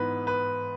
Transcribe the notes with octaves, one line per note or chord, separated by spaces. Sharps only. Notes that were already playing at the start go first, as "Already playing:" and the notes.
Already playing: G#2 E3 B3 B4
B4